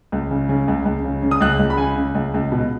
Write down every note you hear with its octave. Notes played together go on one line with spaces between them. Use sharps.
C#2
C#3
C#3
C#2
C#2
C#3
C#3
D#6
C#2 F#6
C#2
B5
C#3 G#5
C#3
C#2
C#2
B2